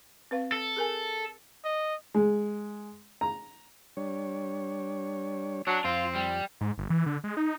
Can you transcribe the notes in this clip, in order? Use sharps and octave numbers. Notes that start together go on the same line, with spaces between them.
C4 B4 F5
A4
G#4 A#4 G#5
D#5
G#3
A#5
G3 D4 C#5
F#3 D4
F2 C4 F4
G3
G#2
G1
E3
D3
G#3
D#4